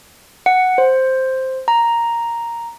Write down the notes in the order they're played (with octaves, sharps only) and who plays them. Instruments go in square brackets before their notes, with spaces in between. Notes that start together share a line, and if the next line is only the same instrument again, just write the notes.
[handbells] F#5
C5
A#5